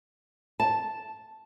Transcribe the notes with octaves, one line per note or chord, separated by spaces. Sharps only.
A5